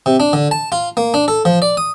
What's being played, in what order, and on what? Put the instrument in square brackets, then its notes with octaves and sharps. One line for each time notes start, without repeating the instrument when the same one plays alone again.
[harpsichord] C3
D4
D3
A5
F4
A#3
D4
A4
F3
D5
D#6